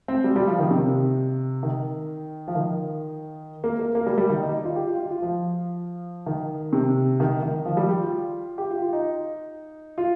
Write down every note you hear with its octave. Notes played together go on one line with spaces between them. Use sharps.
C4
G3
G3
F3
D#3
C3
D#3
F3
D#3
A#3
A#3
A#3
G3
G3
D#3
D#4
D#4
F4
G4
F4
F4
F4
F3
D#3
C3
D#3
D#3
F3
G3
G4
F4
G4
F4
F4
D#4
F4